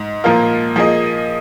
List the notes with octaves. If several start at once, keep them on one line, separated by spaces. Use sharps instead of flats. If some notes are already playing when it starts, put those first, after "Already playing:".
Already playing: G#2
A#2 F3 A#3 F4 A#4
F3 A#3 G#4 D#5